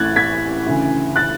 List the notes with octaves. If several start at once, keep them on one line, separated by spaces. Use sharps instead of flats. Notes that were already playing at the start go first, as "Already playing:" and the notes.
Already playing: A1 A2 E3 F#6 G#6 A6
G#6 B6
D2 C#3 E3
F#6 A6